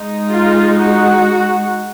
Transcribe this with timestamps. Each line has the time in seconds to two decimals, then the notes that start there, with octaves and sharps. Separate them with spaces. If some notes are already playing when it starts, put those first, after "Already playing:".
Already playing: G#3 D#4
0.30 F4
0.75 F#4